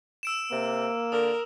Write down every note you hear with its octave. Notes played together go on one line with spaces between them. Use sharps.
E6 D7 E7
C3 A#3
D3 A#4 D#6